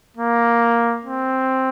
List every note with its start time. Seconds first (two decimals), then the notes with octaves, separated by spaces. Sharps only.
0.17 A#3
1.05 C4